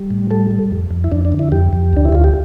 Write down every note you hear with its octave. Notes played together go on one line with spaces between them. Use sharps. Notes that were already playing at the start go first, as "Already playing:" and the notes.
Already playing: G3
A2
G3 A4
G3
F2
F2
E4
F2 D4
D4
D3
E4
F2 G4
F2
D2 D4
E4
D2 F4
G4